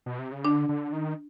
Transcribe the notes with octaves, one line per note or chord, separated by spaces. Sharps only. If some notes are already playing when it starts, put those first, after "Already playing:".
B2
C3
C#3
D3 D4
D3
D#3